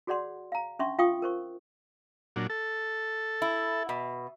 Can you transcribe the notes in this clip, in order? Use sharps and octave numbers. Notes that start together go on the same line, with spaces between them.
F#4 G#4 C#5 D5 F#5 C6
F5 A#5
C#4 D4 E5 C6 C#6
F4 F5 G5 C#6 D#6
A#4 C5 C#6
A#2 F#3 D4
A4
E4
B2